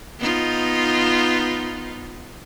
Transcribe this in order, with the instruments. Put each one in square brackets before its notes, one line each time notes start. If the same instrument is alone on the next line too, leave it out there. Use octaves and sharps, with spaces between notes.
[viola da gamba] B3 D#4 F4